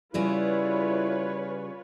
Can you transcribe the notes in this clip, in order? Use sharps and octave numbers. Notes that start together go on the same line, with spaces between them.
C#3 G3 E4 F4 G#4 B4 C#5